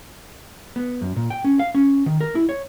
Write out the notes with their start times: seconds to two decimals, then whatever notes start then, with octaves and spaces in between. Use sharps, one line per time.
0.76 B3
1.01 F#2
1.16 A#2
1.30 G5
1.44 C#4
1.59 F5
1.75 C#4
2.06 D#3
2.21 A#4
2.35 E4
2.49 C#5